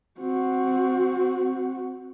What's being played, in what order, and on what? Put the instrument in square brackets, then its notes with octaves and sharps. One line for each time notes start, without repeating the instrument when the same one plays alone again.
[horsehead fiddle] C4 F#4